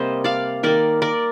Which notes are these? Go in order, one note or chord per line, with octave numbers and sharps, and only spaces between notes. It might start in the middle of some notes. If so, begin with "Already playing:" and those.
Already playing: C3 G3 A#3 C5 D#5
D5 F5
D#3 A#3 A#4 D5
A#4 D5